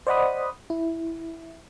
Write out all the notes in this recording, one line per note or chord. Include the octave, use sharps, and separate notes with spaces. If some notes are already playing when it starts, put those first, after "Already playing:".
C5 D5 D#5 F#5 B5 D#6
E4